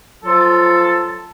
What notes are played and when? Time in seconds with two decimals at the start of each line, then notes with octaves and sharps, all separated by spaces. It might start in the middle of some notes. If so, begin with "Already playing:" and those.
0.24 F3 F#3 F4 A4